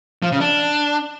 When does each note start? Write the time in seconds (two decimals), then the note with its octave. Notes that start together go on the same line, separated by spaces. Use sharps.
0.23 F3
0.32 C#3
0.41 D4